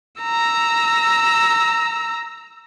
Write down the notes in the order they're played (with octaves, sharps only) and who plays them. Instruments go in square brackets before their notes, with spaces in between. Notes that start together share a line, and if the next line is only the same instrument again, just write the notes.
[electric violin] A#5 E6